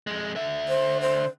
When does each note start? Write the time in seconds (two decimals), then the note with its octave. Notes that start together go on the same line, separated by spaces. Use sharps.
0.07 F2 G#3
0.36 D3 E5
0.68 C5
1.01 C5